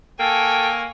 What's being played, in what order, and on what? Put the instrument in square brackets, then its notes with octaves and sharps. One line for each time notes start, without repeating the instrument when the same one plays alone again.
[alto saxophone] A#3 [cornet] A4 [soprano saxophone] G5 [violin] G#5 C#6